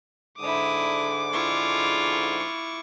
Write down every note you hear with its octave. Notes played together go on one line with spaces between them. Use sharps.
G#2 D3 E4 D6 D#6
E4 F4 C#6